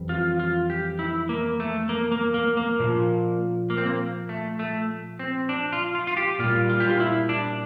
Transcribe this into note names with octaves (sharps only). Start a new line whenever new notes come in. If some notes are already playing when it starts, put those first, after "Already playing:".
Already playing: F2 E3 G3
F4
F4
G4
E4
A#3
A3
A#3
A#3
A#3
A#3
A#2 F3
A#3
C4
A#3
A3
A3
C4
D4
F4
F4
F4
G4
A#2 G3 F4
F4
G4
F4
E4
D4